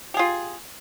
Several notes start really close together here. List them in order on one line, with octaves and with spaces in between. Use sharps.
G4 G#4 F4